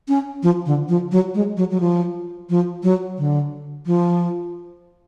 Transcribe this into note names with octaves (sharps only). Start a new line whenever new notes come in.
C#4
F3
D3
F3
F#3
G#3
F#3
F#3
F3
F3
F#3
D3
F3